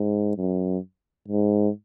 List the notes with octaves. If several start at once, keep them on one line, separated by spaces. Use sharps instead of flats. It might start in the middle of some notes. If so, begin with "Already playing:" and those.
Already playing: G#2
F#2
G#2